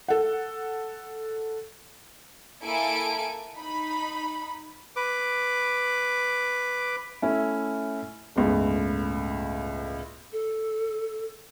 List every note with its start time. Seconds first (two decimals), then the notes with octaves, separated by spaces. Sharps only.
0.08 A4 F#5
2.63 A#3 E4 A4 G#5 D7
3.57 D#4 B5
4.96 B4 D6
7.22 A3 C#4 E4
8.36 G1 C#2 A2
10.33 A4